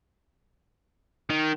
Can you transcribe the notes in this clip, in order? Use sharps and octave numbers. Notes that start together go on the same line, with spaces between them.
D#3